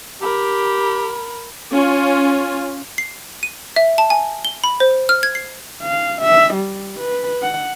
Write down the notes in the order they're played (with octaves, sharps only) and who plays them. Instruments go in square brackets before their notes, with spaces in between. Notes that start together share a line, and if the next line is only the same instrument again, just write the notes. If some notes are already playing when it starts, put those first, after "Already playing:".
[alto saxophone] G4 [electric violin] A#4 B5
[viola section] C#4 F4
[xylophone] C7
D#7
E5
A5
G#5
G7
B5
C5
F6
G#6
C7
[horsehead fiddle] F5
E5
G3
B4
F#5